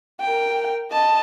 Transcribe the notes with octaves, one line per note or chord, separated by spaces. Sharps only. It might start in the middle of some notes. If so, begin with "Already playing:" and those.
A#4 G5
D#5 A5